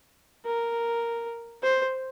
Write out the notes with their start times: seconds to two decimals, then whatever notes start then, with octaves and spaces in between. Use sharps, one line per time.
0.45 A#4
1.63 C5